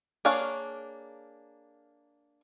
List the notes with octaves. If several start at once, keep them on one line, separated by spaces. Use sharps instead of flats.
A#3 D4 G#4 C#5 F5